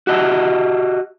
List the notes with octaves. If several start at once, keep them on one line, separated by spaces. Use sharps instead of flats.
F#4 G4 D#5 E5